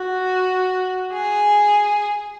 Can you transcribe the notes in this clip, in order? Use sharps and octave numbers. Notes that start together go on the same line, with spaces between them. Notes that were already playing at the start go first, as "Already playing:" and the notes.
Already playing: F#4
G#4